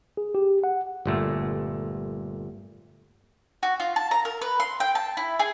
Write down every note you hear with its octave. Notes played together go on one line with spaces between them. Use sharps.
G#4
G4
F#5
G1 A#2 A3
F#4
F4
A5
A#5
A#4
B4
C6
G5
A5
E4
G#4